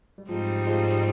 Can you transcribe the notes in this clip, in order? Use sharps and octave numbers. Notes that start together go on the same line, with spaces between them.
G3
G#2 F3 G3 G#3 C4 D#4
F3 G#3